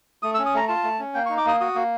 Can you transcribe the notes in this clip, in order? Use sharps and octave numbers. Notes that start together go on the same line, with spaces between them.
A3 D#6
E6
C#4
D#6
A3 A#5
F4 A5
A3
C#4
A#3 G5
C#6
D#4
D6
A#3 D#6
F#4 D#6
A#3